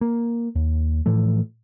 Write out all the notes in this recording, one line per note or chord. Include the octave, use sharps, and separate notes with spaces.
A#3
D#2
A2 E3 F3 A3